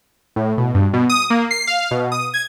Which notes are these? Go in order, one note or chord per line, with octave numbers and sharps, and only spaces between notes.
A2
B2
G2
B2
D#6
A#3
C7
F5
B2
D#6
G#6